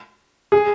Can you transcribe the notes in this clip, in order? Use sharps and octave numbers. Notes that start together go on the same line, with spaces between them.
G#4